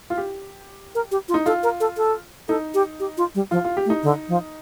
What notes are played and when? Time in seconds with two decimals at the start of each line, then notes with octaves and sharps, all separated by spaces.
0.10 F4
0.18 G4
0.95 A#4
1.11 G4
1.28 F4
1.34 D#4
1.46 F4 A4
1.63 A#4
1.80 A4
1.97 A4
2.48 D#4 A4
2.74 G4
3.00 G4
3.17 F4
3.35 G3
3.51 F3 F4
3.65 F4
3.77 G4
3.85 A3
3.90 D#4
4.03 D3
4.28 F3